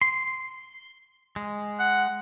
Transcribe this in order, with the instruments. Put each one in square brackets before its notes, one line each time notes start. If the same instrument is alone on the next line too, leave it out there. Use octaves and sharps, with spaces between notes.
[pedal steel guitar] C6
G#3
[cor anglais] F#5